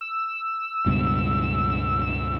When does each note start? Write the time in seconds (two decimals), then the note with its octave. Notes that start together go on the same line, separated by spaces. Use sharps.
0.01 E6
0.86 C#2 G2 B2